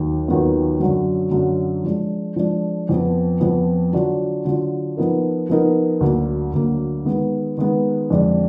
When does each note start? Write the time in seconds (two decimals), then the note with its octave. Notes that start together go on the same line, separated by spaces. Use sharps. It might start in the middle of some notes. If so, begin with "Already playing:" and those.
Already playing: D#2 D#3 F#3
0.28 D#2 D#3 F#3 B3 F4
0.80 F#2 D3 F#3
1.32 F#2 D3 F#3
1.84 F3 G#3 D4
2.36 F3 G#3 D4
2.89 F2 F3 B3
3.40 F2 F3 B3
3.93 D3 F#3 D4 F4
4.45 D3 F#3 D4 F4
4.97 F3 B3 D#4 A#4
5.50 F3 B3 D#4 A#4
6.01 D2 D3 F#3 A#3
6.53 D2 D3 F#3 A#3
7.05 D#3 G#3 B3
7.57 D#3 G#3 B3
8.10 F2 D3 G#3 D4